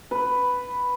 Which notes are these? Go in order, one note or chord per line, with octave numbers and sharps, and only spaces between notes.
B4